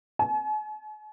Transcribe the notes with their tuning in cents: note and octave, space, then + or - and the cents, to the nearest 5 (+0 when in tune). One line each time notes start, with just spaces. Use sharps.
G#5 +45